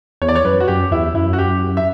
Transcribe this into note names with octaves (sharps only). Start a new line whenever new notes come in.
E2 C#5
D5
C#5
F#2 B4
F#4
F#2 G4
E2 E4
F#2 E4
F#4
G4
E5